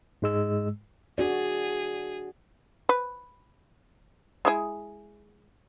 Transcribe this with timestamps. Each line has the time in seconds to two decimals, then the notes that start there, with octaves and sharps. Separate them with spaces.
0.22 G#2 G#3 E6
1.18 D4 F#4 G#4 D5
2.89 B4
4.45 G#3 E4 G#4